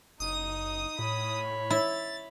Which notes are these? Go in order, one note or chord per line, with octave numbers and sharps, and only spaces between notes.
F#1 D#4 D#6
A2 C#5 B5
E4 A6